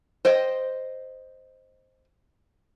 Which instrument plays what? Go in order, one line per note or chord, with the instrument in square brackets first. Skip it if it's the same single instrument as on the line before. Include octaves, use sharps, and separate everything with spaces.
[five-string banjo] C5 D#5 G5